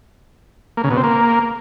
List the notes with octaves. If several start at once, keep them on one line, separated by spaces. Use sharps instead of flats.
A#3
C#3
B2
C4
A#3